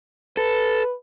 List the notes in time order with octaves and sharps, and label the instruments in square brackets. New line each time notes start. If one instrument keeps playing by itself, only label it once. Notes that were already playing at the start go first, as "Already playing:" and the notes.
[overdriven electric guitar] A4 [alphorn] B4